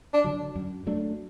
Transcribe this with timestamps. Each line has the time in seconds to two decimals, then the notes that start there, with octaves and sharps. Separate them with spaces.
0.14 D4
0.24 D3 F#3
0.55 F#2
0.87 F#3 A3 D4